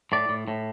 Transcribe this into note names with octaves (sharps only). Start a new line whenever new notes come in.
A2 D5
A2
A2